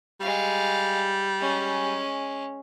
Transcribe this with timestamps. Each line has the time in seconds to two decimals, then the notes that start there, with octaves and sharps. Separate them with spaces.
0.20 G3 G#3 F5
1.40 G#3 C#4